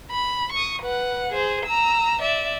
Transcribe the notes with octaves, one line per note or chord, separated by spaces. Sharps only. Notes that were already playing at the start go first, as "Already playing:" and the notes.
B5
C#6 D#6
B4 F#5
G#4 C5
A#5 E6
D5 E5